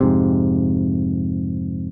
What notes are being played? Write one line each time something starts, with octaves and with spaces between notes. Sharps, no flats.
F2 G#2 C3